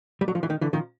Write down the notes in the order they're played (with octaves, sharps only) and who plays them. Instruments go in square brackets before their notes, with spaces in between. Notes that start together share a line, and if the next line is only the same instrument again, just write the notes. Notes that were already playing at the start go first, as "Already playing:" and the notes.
[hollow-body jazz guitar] G3
F#3
F3
E3
D#3
D3 E3
D#3 F3